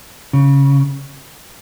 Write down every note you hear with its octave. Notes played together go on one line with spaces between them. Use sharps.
C#3